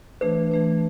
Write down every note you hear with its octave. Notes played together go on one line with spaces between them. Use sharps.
E3 A3 D4 B4
E3 A3 D4